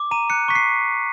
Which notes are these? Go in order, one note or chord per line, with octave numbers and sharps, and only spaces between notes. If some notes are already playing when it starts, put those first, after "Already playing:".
Already playing: D6
A#5 D#7
F#6 C#7
C#6 B6
C7